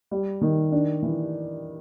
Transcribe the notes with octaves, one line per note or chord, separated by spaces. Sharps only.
G3
D#3
D4
E3